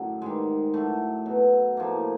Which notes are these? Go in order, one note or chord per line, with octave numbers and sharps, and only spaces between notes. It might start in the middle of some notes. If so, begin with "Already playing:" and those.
Already playing: F#2 A2 D3 F#3
G#2 D#3 G3 G#3
A2 F#3 A3
B2 F#3
A2 F3 A#3